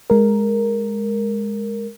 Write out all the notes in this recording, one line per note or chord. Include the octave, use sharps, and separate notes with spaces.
G#3 A#4